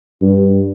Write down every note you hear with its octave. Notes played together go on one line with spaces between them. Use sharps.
G2